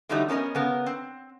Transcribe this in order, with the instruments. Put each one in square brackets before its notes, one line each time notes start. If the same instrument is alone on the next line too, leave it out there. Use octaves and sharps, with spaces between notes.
[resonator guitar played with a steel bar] D3 E3 F#3 G3 A3 D#4
B3 C#4 A4 A#4 D#5
C#3 B3 A#4
C4